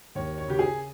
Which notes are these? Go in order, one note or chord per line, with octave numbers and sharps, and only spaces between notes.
D#2 C#5
C#5
C#3 G4
G#4